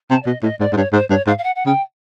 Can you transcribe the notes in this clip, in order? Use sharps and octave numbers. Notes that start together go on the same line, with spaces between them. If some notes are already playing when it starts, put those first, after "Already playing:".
C3 A5
D5
B2 D#5
A2 D#5
G#2 D5
G#2
G2 C#5
G#2 C5
G2 C#5
G#2 F5
F5
F#5
F#5
C#3 G5